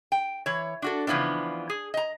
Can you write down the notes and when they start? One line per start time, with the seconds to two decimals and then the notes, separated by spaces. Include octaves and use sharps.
0.12 G5
0.46 E3 C#5
0.82 D4 F#4 A4
1.07 C#3 E3 F3 B3 D4
1.70 G#4
1.94 D#5 A#5